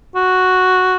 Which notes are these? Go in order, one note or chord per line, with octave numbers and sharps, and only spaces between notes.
F#4